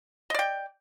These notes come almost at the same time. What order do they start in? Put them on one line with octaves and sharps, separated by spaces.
D#5 D5 G5